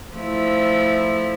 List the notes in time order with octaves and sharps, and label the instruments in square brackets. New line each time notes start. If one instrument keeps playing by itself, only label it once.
[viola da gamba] F3 A3 E4